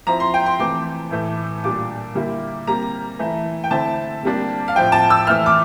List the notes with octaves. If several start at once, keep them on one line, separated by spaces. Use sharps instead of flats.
F3 C4 E4 A#5
C6
G5
C6
C3 E3 A3 D6
A2 E3 A3
A#2 G3 D4 D6
D3 G3 A#3 E4
C3 G3 A#3 A#5
E3 A3 E4
G5
D3 A3 C4 E4 A5
C3 G3 A#3 D4
F5
A2 F3 C4 E4 G5
A5
E6
E3 A3 E4 F6
D6